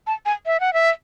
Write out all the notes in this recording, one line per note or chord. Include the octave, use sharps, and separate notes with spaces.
A5
G#5
E5
F#5
E5